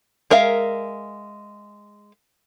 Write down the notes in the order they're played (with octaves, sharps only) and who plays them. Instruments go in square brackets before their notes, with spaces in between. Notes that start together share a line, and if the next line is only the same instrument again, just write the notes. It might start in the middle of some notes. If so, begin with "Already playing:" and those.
[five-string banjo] G#3 A#4 E5 F5